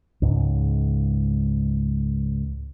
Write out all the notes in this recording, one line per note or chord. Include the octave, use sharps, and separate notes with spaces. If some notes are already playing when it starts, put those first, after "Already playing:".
C#2 G#2